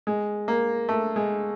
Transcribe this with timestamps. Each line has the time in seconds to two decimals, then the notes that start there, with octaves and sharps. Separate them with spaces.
0.07 G#3
0.48 A#3
0.89 A3
1.16 G#3